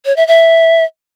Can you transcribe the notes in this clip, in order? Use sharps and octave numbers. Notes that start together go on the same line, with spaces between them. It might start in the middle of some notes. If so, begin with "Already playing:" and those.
C#5
E5
E5